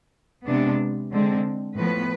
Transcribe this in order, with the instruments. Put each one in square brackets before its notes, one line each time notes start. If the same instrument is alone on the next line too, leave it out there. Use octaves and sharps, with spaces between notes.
[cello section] C3 G#3 B3 D4
D3 G#3 C4
A2 F3 B3 B4